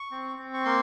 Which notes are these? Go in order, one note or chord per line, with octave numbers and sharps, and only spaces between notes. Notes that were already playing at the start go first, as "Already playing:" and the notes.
Already playing: C#6
C4
C4
C#6
A#3 C6